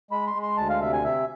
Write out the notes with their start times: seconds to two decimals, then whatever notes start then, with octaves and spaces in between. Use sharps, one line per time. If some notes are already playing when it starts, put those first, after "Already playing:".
0.11 G#3 B5
0.27 C6
0.34 G#3
0.42 C6
0.57 D2 A5
0.69 F5
0.81 C3 E5
0.93 G#5
1.04 C3 E5